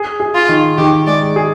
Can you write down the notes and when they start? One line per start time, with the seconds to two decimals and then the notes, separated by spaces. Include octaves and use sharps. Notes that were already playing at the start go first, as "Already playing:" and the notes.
Already playing: G#4
0.20 G#4
0.35 F4
0.49 D#3
0.78 D#3 G4
1.07 G#3 D5
1.36 G#4